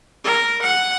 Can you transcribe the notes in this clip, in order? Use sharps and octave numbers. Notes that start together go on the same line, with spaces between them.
A#4
F#5